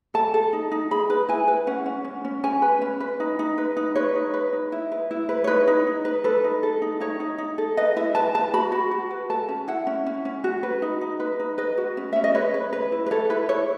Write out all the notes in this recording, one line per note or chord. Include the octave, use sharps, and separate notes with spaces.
A4 A5
A4
D#4
D#4
G#4 B5
B4
E4 G#5
B4
C#4 F#5
C#4
C#4
C#4
C#4 G#5
B4
C#4
B4
D#4
D#4
B4
D#4
B4 C#5
D#4
B4
D#4
E4
B4
E4
B4
C#5
D#4 B4
D#4
D#4
B4
A4 B4
D#4
A4
D#4
D#4 C#5
D#4
D#4
A4
B4 D#5
E4 E5
B4 A5
B4 A5
F#4 B5
F#4
F#4
B4
A4 A5
C#4
E4 F#5
C#4
C#4
C#4
F#4
B4
D#4
D#4
B4
D#4
B4 D#5
F#4
C#4
C#4 E5
D#5
B4 C#5
B4
B4
E4
B4
A4 C#5
E4 B4
E4 C#5